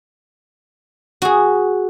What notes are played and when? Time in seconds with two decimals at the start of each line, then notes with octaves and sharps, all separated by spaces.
1.22 F#4 G#4